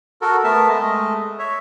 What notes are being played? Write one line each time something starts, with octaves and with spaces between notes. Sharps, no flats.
F#4 A4 A#4
A3 B3 A#4 E5 A5
G#3 A3 D#5
C#5 E5